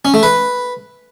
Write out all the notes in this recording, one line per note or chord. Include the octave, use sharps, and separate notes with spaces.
C#4
A3
B4